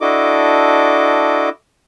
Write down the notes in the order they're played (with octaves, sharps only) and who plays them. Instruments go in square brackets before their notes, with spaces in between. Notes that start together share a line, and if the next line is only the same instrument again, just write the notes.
[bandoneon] D4 E4 F#4 A4 D#5 D6